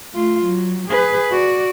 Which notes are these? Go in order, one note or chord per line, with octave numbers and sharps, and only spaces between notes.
A3 F4
F#3
G#4 B4
F#4 D5